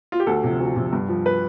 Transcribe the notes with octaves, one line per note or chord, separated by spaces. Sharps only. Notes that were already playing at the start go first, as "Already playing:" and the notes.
F4
G4
D2 A4
C3 F3
D2
C3 F3
G2
F3
B4